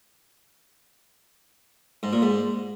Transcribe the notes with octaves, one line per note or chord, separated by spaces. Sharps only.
G#2
A#2
G#2